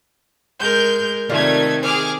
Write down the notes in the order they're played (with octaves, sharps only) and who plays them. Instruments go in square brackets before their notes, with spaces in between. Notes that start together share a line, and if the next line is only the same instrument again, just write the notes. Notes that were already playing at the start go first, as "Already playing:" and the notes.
[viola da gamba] G#3 A#4 [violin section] G6
[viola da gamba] C3 D#3 [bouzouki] G3 F4 A#4 [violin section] A3 G#6
[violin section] G#4 D6 F6 [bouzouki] C5